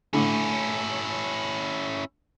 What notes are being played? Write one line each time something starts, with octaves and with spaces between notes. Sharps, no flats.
A2 D3 C#4 E4